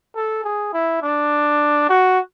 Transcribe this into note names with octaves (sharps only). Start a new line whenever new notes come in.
A4
G#4
E4
D4
F#4